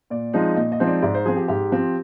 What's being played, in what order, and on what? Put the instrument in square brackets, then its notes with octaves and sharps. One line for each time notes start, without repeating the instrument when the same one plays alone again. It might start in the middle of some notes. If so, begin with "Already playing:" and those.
[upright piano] A#2 D5
F3 G#3 C4 D#4
A#2 D#5
D#5
F3 G#3 C4 D#4
D5
G#2 D5
C5
F3 C4 G#4
G4
G#2 G4
F3 C4